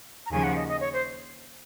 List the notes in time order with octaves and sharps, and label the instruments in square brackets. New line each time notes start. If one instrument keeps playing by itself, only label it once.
[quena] A#5
[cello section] D#2 C#3 F3 [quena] G#5
[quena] F#5
D#5
D#5
C#5
C5